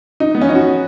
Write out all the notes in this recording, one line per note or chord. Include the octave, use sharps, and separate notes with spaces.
D#4
B3
C#4
D#4
F#4